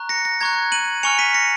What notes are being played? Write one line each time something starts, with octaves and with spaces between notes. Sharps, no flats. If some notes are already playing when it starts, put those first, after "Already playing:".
Already playing: A#5 C#6 F#6
A#6 C#7
A#6
A#5 C#6 F#6 G#6
D#7 F#7
G#5 C#6 F6 C#7 F7
B6 D#7
A#6 C#7